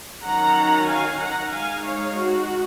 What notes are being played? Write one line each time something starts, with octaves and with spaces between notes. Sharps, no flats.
D#3 F#3 C#4 F#5 A#5
F5 G#5
F#5 A#5
G#3 D#4 F5 G#5
C#5 F5
F#4